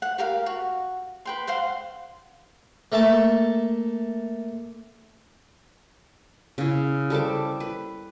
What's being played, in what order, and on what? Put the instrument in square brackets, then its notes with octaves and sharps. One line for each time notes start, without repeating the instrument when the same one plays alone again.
[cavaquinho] F#5
G4 A#4 F5
F#4
B4 G5 C6
C5 F5 F#5 C6
[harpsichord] A3 A#3 E5 A5
[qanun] C#3 E4
G3 A4 C5 D6
B4